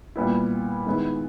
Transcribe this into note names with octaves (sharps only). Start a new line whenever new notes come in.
A#2 G3 B3 E4
D#3 G#3 B3 E4